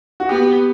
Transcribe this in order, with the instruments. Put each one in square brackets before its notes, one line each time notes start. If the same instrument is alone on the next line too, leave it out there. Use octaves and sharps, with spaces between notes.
[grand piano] F#4
[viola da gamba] B3 [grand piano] G4